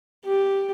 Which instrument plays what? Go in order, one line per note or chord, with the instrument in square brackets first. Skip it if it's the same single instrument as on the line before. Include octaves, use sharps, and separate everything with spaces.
[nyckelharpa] G4